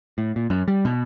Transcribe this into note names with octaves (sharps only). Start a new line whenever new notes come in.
A2
A#2
F#2
G3
B2